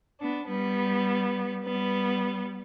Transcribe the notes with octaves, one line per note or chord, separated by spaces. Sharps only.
B3 D4
G3 B3
G3 B3